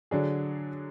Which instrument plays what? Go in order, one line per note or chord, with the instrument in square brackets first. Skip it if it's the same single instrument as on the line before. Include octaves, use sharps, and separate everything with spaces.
[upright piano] D3 F#3 D4 G#4